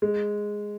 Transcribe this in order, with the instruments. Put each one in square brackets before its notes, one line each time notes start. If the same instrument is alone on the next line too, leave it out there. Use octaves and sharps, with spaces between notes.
[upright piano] G#3